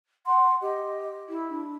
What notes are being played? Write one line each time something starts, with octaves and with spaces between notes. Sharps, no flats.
F#5 C6
G4 D#5
E4
D4